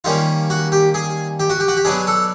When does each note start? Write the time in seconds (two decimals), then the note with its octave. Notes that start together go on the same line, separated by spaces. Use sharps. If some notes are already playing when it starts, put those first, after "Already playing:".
0.04 D#3 G3 A#3 C#4 F4
0.50 F#4
0.72 G4
0.94 G#4
1.40 G4
1.50 F#4
1.60 G4
1.68 F#4
1.77 G4
1.85 B2 F#3 B3 D4 G#4
2.07 A4